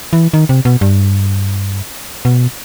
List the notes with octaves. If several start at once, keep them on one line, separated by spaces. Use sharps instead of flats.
E3
D#3
C3
B2
G2
B2